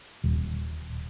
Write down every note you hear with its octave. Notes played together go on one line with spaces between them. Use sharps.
D#1